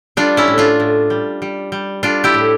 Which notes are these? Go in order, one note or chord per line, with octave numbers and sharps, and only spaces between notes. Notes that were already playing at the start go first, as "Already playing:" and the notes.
G3 D4 F4
C#4 E4
A2
D4 F4
A2
G3
G3
G3
G3 D4 F4
E4 G4
A2